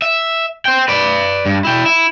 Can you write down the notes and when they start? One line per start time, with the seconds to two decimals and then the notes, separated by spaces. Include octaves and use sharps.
0.02 E5
0.65 C5 G5
0.88 B4 D5
1.46 G2
1.65 E4 G5
1.86 E4